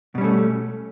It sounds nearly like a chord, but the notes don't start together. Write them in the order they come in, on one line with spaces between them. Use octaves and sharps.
B2 G3 C#4 A3